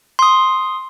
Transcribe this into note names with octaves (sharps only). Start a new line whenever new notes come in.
C6 D#6